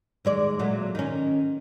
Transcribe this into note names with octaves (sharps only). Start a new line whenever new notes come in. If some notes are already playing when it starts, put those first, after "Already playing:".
D#2 G#3 D5
A#2 F#3 A3
D#3 C#4